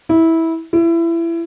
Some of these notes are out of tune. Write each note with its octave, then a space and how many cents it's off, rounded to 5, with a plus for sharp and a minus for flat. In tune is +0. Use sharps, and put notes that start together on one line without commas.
E4 -15
E4 +25